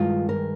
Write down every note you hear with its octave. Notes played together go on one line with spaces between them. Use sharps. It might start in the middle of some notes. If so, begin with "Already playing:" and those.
Already playing: G2 D#3 G#3 F4
A#4